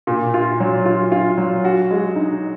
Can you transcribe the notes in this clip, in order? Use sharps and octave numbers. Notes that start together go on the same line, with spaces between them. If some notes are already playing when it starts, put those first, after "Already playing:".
A#2
F4
F#3
F4
F4
F#3
F#4
G#3
D#4